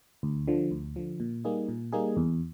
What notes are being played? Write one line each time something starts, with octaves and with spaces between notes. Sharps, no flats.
D2
D3 F3
D2
D3 F3
A#2
G3 A#3 D#4 G#4
A#2
G3 A#3 D#4 G#4
E2